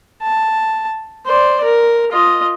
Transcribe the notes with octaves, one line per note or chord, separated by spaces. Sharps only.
A5
C5 D5
A#4
F4 D#5